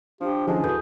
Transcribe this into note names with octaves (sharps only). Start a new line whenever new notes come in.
F3 D4 G4
D3 F3 G#3 C#4 E4 G#4 A5
E2 F#4 A4 B4 D#6 G6